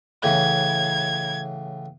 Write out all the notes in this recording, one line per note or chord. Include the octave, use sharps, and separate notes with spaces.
A2 C#3 E3 G#6